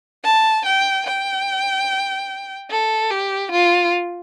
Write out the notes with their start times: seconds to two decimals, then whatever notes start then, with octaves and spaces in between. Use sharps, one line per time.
0.25 A5
0.66 G5
1.07 G5
2.70 A4
3.11 G4
3.52 F4